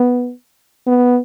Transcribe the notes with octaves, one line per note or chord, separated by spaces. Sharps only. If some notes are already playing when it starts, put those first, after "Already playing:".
Already playing: B3
B3